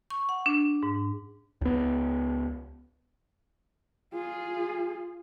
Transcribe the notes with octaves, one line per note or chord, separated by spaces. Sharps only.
C#6
F#5
D4
G#2
C#2 B3
F4 G#4